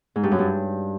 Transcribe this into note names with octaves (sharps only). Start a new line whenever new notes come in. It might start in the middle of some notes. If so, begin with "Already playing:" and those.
G#2
G2
F#2
G2